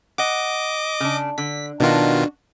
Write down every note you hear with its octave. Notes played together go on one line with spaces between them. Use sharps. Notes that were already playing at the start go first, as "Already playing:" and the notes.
D#5 F#5 D6
C#3 D4
D3 B6
B2 D#3 D4 F4 F#4